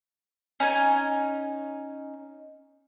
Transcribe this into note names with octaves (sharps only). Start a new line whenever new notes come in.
C#4 D#4 G#5